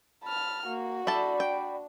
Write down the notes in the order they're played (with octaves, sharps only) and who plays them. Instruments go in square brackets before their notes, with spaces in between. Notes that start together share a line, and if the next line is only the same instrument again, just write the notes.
[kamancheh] A5 F6 [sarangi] B5
[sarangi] A#3 [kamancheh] F#4
[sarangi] D4 [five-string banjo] E4 A4 A5 [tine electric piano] D5 B5
[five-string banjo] G5